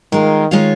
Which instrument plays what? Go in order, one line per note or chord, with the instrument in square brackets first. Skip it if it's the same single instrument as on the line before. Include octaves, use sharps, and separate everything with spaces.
[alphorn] D#3 [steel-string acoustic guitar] G#3 F4 A#4
[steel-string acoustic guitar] D#3 G#3 F4 C#5 F5